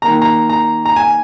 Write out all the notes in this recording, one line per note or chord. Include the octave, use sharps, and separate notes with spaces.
D#3 A#3 A#5
A#5
A#5
A#5
G#5